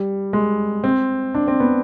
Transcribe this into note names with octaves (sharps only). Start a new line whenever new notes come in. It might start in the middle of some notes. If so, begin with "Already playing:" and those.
Already playing: G3
G#3
C4
D4
C4
B3